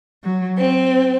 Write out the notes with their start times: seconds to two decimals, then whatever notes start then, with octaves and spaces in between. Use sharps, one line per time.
0.24 F#3
0.58 C4